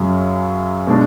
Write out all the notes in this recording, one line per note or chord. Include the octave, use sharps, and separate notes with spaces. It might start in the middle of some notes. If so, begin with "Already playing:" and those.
Already playing: F#2 C#3 F#3
B2 G#3 D4